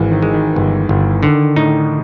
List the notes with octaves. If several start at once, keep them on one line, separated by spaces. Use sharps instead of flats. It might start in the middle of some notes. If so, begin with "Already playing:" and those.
Already playing: G#1 E3
D#3
G#3
D#3
G1
G1
D3 D#3
A2 D#4